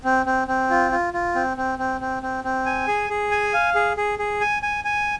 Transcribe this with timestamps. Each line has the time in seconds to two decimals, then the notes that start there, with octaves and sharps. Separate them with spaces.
0.04 C4
0.26 C4
0.48 C4
0.70 F4
0.92 F4
1.13 F4
1.35 C4
1.57 C4
1.79 C4
2.01 C4
2.23 C4
2.44 C4
2.66 G#5
2.88 G#4
3.10 G#4
3.31 G#5
3.54 F5
3.75 G#4
3.97 G#4
4.19 G#4
4.41 G#5
4.63 G#5
4.84 G#5